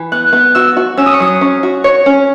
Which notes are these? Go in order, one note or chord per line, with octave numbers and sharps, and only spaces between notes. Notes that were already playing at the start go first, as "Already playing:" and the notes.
Already playing: E3
B3 F#6
B3
F#4 E6
F#4
C#4 E6
D#6
C#6
F#3 D#6
C#4
F#4
C#5 C#6
C#4